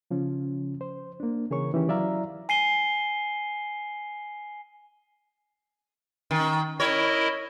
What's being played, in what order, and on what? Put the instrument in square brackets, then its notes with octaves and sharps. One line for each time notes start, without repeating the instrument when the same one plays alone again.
[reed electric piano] C#3 F3 C#4
C5
A#3 D4
C#3 E3 G#4 A#4 C#5 C#6
D#3 E3 C#4 G4
F#3 E4 D5 E5 F5 A#5
[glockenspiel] G#5 C7 D#7 G7
[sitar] D#3
[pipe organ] E4 A#4 D#5 [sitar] C#5